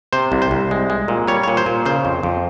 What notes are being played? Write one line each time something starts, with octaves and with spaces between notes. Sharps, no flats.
C3 C5
C2
C5
C2
G#3
G#3
A#2
G3 C#5
A#2 C#5
C5
A#2
C#3 C5
F2
F2